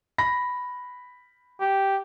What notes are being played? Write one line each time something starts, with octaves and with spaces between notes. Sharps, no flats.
B5 A#6
G4